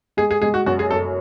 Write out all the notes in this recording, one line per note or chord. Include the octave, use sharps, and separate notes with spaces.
G#3 G#4
G#4
G#3 G#4
F#4
F#2 F#4
G#4
F#2 A4